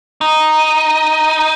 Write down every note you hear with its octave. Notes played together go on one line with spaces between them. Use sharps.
D#4